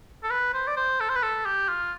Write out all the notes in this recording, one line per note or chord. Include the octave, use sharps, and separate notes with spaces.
A4
B4
C5
D5
C5
A4
C5
B4
A4
G4
F4